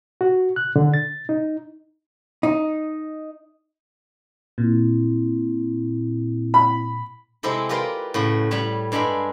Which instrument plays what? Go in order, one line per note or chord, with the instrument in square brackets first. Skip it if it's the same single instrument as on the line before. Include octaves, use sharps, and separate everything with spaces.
[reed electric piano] F#4
F#6
D3
A6
D#4
[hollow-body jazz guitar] D#4
[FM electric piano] A#2 [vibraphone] C4 E4
[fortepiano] B5
[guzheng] C3 G#3 C4 E4 G4 A4
F4 G4 A#4 B4 D5 F5
A2 C#3 F#4
A2 G3 C#5 A5 B5
G2 G#3 D4 E5 B5